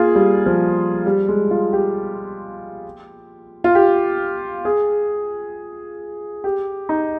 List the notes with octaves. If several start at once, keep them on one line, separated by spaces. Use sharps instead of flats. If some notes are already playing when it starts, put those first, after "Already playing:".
Already playing: A#3 F4 G#4
G3
F3
G3
G#3
F4
G4
F4
G4
G#4
G4
D#4